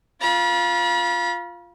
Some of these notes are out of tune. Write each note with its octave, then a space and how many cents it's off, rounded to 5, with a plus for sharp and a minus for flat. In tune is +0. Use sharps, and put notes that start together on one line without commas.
F4 +0 B5 -40